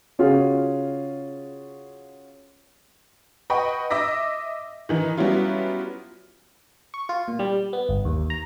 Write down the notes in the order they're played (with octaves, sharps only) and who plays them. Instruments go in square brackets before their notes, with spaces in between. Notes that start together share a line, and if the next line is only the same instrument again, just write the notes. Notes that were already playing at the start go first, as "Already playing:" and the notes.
[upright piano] C#3 C#4 F4 F#4 G#4
[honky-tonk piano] B4 D#5 F#5 G5 B5 C#6
D#5 E5 D6 E6 A#6 B6
D#3 E3 D#4
F#3 G3 B3 C#4 E4 F4
[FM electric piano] C#6
F4
A#2
G3
B3
G1
D#2
A#5